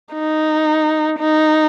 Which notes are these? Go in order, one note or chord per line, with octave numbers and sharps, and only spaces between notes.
D#4
D#4